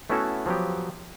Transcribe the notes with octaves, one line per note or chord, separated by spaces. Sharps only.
A3 B3 C#4 E4 F#4 A4
F3 F#3 B3 G4